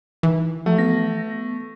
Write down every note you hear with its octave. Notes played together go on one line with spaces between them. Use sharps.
D#3 E3
F3 A3 E5
B3 A#6